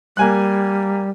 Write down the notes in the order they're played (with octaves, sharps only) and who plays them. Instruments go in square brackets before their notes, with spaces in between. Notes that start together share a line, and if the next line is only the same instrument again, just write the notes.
[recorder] G3 [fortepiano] A#3 G#5 F#6